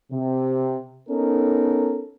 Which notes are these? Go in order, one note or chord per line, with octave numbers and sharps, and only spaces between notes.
C3
B3 C#4 D#4 A4 A#4